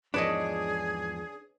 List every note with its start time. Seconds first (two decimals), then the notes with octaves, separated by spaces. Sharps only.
0.14 E2 G#2 F3 D4 G#4 B4 C#5 D#5